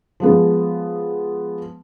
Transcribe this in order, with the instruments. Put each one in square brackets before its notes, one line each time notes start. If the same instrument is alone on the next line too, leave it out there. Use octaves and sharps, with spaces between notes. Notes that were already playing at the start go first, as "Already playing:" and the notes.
[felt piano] F3 G#3 B3